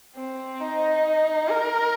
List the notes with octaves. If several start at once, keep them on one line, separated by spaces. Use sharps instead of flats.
C4
D#4
A#4